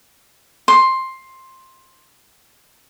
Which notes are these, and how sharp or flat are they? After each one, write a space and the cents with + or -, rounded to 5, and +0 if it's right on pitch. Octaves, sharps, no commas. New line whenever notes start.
C6 +10